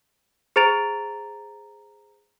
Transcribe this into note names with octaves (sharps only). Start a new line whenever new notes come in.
G#4 C5 A#5 A6 D7 F7